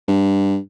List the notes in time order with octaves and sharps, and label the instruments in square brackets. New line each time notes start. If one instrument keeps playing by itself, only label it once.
[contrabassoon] G2